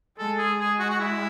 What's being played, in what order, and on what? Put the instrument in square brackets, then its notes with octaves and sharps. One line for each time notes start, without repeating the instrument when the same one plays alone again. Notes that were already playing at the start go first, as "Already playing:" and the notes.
[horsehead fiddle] G#3 [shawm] A4
[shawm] G#4
G#4
F#4
F#4
E4